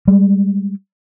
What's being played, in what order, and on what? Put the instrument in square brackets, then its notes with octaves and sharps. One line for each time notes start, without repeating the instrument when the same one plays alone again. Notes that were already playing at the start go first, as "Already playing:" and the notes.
[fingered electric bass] G3 G#3